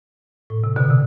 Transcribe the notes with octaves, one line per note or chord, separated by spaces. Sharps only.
A2
C3
B2 D3
C3